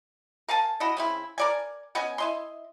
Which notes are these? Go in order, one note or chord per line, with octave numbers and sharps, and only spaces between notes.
A#4 F5 G#5 A5
E4 F#4 D#5
C#3 C4 E4
A#4 D5 G#5
B3 C#4 D#5 G#5
E4 D#5 C6